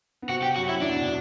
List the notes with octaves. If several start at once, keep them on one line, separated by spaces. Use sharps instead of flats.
B3
C3 C4 F#4
G4
F#2 F#3 F#4
E4
E2 E3 D4
B2